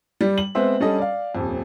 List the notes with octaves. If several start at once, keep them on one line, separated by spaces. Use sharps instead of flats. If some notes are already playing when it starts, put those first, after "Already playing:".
G3
F#7
G#3 B3 C4 C5 E5
G3 C#4 D4 A4 D#5
D5 F5
D#1 F2